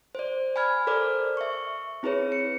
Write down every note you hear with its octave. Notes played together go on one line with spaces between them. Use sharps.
C5 D5
G#5 B5 F6 G#6
A4 A#4 C5 D5 D6 F6
E5 C#6
C4 E4 G#4 B4 C#5
C#7